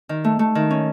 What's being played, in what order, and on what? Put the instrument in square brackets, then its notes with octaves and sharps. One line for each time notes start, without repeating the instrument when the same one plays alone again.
[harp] D#3
A3
A3
D#3
C#4